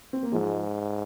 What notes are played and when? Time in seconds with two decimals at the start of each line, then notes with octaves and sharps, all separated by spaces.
0.13 C4
0.23 A#3
0.32 G#2 F3 G#3